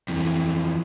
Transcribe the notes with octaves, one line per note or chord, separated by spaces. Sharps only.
F2 E3